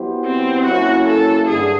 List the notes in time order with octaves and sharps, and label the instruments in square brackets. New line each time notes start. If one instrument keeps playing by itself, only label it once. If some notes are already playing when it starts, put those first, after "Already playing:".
Already playing: [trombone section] F#3 B3 E4 G4 C5
[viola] C4
[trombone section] F#3 A#3 C#4 E4 [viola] F#4
[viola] A4
[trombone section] G2 D3 [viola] G#4